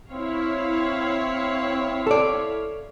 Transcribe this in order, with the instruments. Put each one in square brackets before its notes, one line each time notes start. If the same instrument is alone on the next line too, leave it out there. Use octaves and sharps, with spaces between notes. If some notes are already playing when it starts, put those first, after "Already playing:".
[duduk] C4 [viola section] E4 C#5 F5
[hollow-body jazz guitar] A4 D5